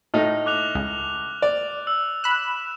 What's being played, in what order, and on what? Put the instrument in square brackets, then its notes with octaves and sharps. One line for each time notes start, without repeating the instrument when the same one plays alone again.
[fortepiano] A2 D#4 [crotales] F6
[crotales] D6 F#6 F7
[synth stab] C#2
[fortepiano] D5
[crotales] E6
[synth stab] B5 F#6 [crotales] E7